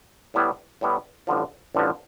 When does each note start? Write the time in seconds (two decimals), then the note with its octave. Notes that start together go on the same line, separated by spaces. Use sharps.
0.34 A2 G3 B3 E4
0.81 A2 G3 B3 E4
1.27 A1 G2 D3 F3
1.75 A1 G2 D3 F3